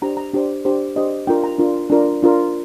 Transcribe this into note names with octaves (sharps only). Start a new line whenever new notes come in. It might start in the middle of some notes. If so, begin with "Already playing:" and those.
D4 G4 C5 A#5
A#5
D4 G4 C5
D4 G4 C5
D4 G4 C5 D#5
D4 F4 A#4 G5
A#5
D4 F4 A#4
D4 F4 A#4
D4 F4 A#4